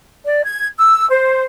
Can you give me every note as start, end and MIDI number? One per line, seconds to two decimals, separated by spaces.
0.24 0.43 74
0.44 0.67 92
0.78 1.06 88
1.10 1.43 72